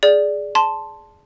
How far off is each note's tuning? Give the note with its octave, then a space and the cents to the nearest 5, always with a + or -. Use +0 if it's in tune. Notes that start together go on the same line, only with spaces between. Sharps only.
G#4 +5 D5 +0
A5 +0 C6 +0